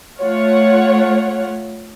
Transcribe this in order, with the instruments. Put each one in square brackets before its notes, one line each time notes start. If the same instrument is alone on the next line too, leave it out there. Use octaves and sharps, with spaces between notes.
[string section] A3 F4 C#5 F#5